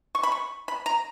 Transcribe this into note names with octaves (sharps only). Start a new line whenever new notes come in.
C#6
B5
C#6
B5
A#5